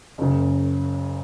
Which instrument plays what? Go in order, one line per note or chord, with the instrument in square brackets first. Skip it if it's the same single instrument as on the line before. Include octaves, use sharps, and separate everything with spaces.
[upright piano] F#1 F#2 C#3